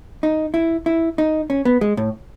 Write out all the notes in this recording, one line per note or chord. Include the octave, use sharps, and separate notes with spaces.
D#4
E4
E4
D#4
C#4
B3
G#3
A2